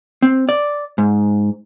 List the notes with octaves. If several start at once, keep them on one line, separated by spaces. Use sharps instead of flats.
C4
D5
G#2